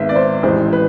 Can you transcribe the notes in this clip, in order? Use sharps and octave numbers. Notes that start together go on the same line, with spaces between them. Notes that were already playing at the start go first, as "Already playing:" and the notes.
Already playing: G#1 G#2 G#3 B3 E5
D5
C5
A1 A2 G#3 C5
B4